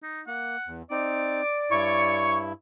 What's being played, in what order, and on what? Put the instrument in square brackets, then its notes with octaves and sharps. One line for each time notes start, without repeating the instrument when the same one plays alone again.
[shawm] D#4
[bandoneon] A#3 [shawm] F#5
[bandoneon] E2
[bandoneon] C4 D#4 [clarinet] D5 [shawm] D6
[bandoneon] G2 E4 [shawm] C#5 [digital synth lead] C#6